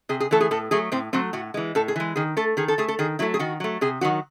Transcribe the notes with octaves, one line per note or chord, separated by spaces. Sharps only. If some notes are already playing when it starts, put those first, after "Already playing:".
C3 G#4
G#4
E3 A3 A4
G#4
A2 A4
F#3 A3 G#4
A2 C4
F#3 A3 C4
A2 F#4
E3 G#3
A2 A4
G#4
E3 G#3
D#3 G#4
A3 A4
D#3 G#4
A4
A3 G#4
A4
D#3 G#4
F#3 A3 E4
G#4
D#3 F#4
F#3 A3
C3 G#4
D#3 F#3 F#4